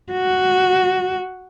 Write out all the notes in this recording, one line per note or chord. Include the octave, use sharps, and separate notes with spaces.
F#4